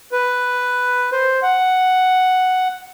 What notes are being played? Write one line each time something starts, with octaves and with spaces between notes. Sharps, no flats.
B4
C5
F#5